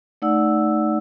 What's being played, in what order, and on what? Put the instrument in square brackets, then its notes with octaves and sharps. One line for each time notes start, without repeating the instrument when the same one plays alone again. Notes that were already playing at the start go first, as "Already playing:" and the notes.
[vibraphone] A3 D#4 D5 F#5 E6